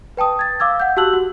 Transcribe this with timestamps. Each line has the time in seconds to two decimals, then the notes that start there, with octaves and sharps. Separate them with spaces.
0.17 B4 G5 A5 D#6
0.39 G#6 A6
0.60 F5 D6 E6 G#6
0.80 F#5 G6
0.97 F#4 G4 A5 E6 F#6 F#7
1.13 F#4